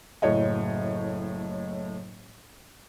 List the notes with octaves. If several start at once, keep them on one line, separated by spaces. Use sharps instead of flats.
F#1 A2 C#5 D#5